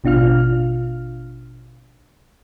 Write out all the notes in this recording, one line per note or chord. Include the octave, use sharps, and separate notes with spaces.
A1 B2 D4 F4 F5 F6